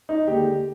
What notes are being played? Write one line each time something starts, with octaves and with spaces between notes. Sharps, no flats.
D#4
D#2 D3 G#3 G4